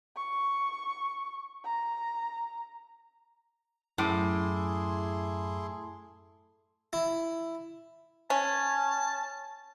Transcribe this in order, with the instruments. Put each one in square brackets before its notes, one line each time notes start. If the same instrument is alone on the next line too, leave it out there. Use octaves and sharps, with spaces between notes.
[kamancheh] C#6
A#5
[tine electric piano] F#2 D6 [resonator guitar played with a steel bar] A2 [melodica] E4 G#4 C6
[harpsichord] E4
[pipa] C#4 [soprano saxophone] A5